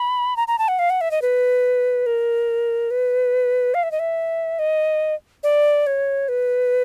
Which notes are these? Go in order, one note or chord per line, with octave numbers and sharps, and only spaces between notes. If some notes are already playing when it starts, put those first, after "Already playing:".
Already playing: B5
A#5
A#5
A5
F#5
F5
F#5
E5
D#5
B4
A#4
B4
F5
E5
D#5
E5
D#5
D5
C#5
B4